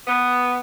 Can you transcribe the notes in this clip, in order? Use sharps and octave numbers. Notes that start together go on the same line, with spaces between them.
B3